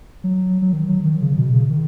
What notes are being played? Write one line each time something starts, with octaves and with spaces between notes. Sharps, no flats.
F#3
F#3
D#3
F#3
D#3
C#3
B2
C#3
D#3